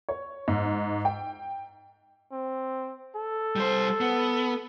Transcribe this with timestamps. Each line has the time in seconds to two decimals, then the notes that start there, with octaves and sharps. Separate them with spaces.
0.09 C#5
0.48 G#2
1.05 G5
2.32 C4
3.16 A4
3.56 G3 C5
4.01 B3